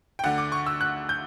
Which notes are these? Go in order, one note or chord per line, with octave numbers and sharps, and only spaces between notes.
G5
D2 D3 F#5
D6
C#6
E6
F#6
G6